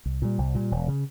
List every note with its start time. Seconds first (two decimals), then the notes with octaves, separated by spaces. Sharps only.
0.06 C2
0.22 A#2 G3
0.38 C2
0.55 A#2 G3
0.71 E1
0.88 C#3